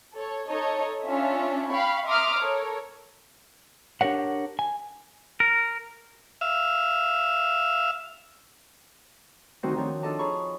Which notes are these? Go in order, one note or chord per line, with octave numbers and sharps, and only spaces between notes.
A4 C#5
D#4 A4 C#5 D#5
C#4 D4 F4 E5
F5 G5 B5 C#6
E5 A#5 C6 D6 D#6 F6
A4 A#4 C#5
D4 G4 A#4 C#5 F#5
G#5
A#4
E5 F5
D2 D#3 C4 D#4 F#4 C5
D#3 F3 D4 F#4 C#5
D4 F4 A4 D#5 A5 D6
G#4 C#5 A#5 B5 C#6